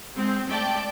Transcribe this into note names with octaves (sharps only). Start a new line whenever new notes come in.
G#3 C4
A3 D5 G5 A5